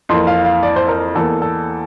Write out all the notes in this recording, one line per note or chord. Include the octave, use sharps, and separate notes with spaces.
F2 E3 A#3 C6
F5
F5
D5
C5
A#4
E2 E3 A#3 A4
A4